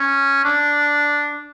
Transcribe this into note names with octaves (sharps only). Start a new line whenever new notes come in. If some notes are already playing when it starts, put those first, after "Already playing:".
Already playing: C#4
D4